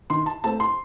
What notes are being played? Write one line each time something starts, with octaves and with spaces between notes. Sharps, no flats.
D#3 C6
A5
A3 C4 A5
C6